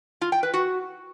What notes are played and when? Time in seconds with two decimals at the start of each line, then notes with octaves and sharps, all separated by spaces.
0.21 F4
0.32 G5
0.43 B4
0.54 F#4